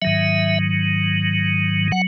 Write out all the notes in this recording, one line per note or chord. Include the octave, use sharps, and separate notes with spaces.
G#2 D#3 F#3 E5
F#3 F#5